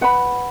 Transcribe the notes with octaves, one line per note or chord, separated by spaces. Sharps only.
B4 F#5 B5